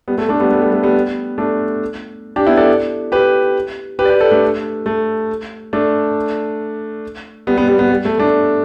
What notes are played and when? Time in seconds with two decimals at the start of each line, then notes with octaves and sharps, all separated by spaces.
0.08 G3 B3
0.18 A3
0.29 A3 D4
0.40 G3 B3
0.51 A3
0.62 G3
0.73 A3
0.83 G3 B3
1.38 A3 D4
2.36 D4 G4
2.47 B3 E4
2.57 A4 D5
3.12 G4 B4
3.99 G4 B4
4.05 D5
4.10 G4 B4
4.21 A4 D5
4.31 A3 D4
4.86 A3
5.73 A3 D4
7.47 G3 B3
7.57 G3 B3
7.68 G3 B3
7.79 G3 B3
7.90 G3
8.05 A3
8.19 A3 D4